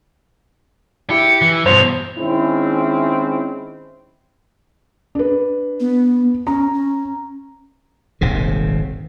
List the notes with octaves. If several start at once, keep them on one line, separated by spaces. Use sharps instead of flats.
E4 G4 C#7
E3
G2 B2 C5 F7
D#3 G#3 C4 C#4 E4
D4 B4
B3
C#4 A#5
C#4
D#1 G#1 C3 D#3